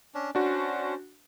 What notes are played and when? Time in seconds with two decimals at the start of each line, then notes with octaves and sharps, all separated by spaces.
0.15 C#4 D4
0.35 C#4 D4 F#4 C5